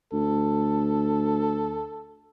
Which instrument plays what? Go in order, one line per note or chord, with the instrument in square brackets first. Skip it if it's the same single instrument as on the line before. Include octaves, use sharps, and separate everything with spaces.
[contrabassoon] D2 [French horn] A4